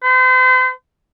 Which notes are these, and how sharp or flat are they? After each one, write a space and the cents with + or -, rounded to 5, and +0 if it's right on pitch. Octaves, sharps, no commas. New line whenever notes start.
C5 -40